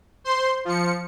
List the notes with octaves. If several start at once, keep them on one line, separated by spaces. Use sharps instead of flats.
C5 C6
F3 C#7